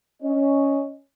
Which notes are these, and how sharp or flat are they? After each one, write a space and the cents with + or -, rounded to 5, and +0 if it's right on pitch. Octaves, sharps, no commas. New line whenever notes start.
C#4 +0 D#5 +0